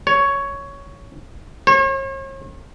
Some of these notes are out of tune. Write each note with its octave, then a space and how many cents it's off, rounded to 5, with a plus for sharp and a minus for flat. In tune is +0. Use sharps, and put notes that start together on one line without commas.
C#5 +5
C#5 -45